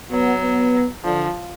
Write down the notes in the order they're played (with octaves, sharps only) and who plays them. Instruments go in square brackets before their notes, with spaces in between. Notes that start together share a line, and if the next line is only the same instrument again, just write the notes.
[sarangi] F#3 [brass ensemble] B3
[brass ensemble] B3
[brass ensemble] D3 [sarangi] F3